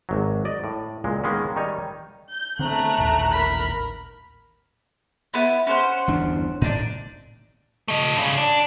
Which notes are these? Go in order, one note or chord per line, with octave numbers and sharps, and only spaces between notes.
G#1 F#3
D5 D#5
A2
C#2 A#2 G#3
D#3 G#3 A#3 B3 C#4
D#3 G3 D#4 C#5 G#5
G6
D3 A3 B3 C4 A#5 F#6
A1 D#2 A#2
A#4 B5
B3 E4
C#4 C5 F#5
G1 E2 D4
A2 D4 D#4
A3 D#5
G2 C#3
D4